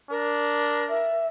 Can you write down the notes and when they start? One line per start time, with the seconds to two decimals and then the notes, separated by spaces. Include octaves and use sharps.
0.11 D4 A#4
0.89 E5